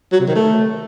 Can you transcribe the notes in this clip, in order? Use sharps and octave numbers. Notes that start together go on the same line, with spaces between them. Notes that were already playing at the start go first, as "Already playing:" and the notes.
F#3
C3
D#3
A3